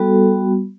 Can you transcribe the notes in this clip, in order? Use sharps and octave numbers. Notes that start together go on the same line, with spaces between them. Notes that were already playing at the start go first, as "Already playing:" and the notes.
Already playing: G3 B3 F#4 A4